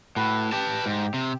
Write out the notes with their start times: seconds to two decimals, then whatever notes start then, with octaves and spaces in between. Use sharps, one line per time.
0.16 A2 F#4 B4 B5
0.52 G4 B4 A5
0.86 G#2
1.14 C3